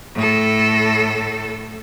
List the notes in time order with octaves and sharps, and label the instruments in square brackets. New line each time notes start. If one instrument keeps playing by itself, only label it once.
[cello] A2 A4